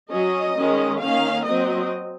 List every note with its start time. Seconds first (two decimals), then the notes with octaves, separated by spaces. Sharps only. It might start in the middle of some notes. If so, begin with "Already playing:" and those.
0.12 F#3 C#4 D#5
0.57 D#3 G#3 C#4
1.01 D#3 A#3 C#4 F5
1.46 F#3 C4 D#5